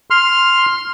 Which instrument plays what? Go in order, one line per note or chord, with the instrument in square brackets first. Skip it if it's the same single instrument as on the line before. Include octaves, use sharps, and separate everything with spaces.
[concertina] C6 F6